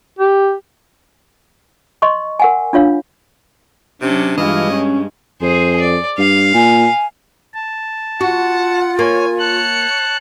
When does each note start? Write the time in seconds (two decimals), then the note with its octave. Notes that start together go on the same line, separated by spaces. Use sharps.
0.19 G4
2.02 D#5 C6 C#6
2.39 A#4 F#5 G#5
2.73 D4 F4 C#5 F5
4.02 C3 F#3 C#4 D4
4.38 G2 E3 G#3 F4 D#5
4.70 C#4
5.41 F2 G#4 C5
5.81 D5
6.18 G2 F5
6.55 A#2 G#5
7.54 A5
8.21 F4 F#4 F#5
8.99 A#3 C#5 G#5
9.39 C#5 A5 F#6 C#7